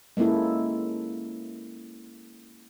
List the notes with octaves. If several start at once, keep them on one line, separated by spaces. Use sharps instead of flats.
G#3 A#3 C#4 E4 A4